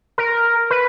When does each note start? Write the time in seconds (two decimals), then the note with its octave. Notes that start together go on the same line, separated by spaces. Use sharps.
0.18 A#4
0.71 B4